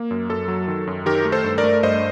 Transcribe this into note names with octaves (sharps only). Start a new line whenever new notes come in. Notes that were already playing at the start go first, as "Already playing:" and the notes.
Already playing: A#3
F#2
F#2 A4
F#3
D#3
F#2
D#3 G4 A#4
A3
A4 C5
G2
A#4 D5
A3
G2 C5 D#5